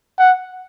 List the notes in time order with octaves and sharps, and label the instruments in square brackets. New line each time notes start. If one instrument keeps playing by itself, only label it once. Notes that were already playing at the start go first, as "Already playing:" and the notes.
[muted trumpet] F#5